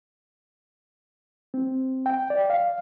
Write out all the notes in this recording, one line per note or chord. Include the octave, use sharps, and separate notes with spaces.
C4
G5
D5
F5